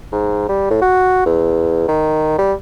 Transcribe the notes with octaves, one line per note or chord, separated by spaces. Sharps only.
G#2
G3
A2
F#4
E2
D#3
G3